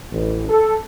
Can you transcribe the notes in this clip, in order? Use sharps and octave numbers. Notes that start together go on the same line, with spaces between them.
A1
A4